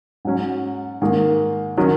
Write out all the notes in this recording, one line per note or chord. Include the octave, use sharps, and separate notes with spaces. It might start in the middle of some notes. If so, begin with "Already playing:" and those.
G#2 F#3 C#4
G#2 D#3 A#3
D#3 F#3 C#4